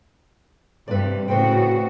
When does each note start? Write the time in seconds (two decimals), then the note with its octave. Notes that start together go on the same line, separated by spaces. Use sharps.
0.88 G2 C3 G3 B4 D5
1.28 A2 C#3 F#4 B4 C5 G5